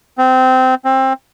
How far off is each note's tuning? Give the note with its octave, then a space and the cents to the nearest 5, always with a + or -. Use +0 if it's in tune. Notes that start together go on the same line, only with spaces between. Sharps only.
C4 -20
C4 +20